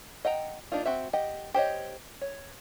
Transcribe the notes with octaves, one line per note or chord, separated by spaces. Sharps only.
D#5 F#5 G5 A#5
A#3 D4 D#4 F4
C4 F#4 E5
G4 D#5 F#5
G4 C5 C#5 D#5
C#5